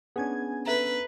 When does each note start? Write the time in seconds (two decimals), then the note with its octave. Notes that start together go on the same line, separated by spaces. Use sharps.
0.16 B3 C#4 D4 G#4 G#5 G#6
0.66 A4 B4 E5 A#5